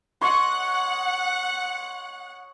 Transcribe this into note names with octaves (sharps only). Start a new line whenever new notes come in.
C#5 D#5 F#5 C6